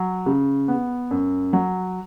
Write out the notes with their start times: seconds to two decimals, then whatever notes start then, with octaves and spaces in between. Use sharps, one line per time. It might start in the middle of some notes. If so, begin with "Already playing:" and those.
Already playing: F#3
0.26 C#3
0.68 B3
1.11 F#2
1.53 F#3